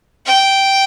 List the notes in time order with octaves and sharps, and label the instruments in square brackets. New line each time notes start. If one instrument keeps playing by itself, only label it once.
[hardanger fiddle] G5